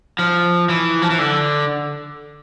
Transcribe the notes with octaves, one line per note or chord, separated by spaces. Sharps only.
F3
E3
F3
E3
D3